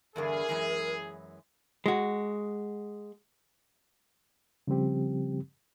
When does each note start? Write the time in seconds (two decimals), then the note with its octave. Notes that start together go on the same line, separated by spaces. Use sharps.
0.16 E2 G2 D3 G#4 A#4
0.49 F#2 E3 G#3
1.86 G#3 F#4
4.67 C#3 F3 G3 C4 G4